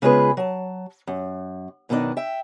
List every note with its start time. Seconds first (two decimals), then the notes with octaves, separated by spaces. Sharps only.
0.02 C#3 G#3 B3 F4 G#4 B4
0.37 F#3 A5
1.07 F#2
1.89 F#2 B2 D#3 A3 D4 D#4
2.17 E5 G5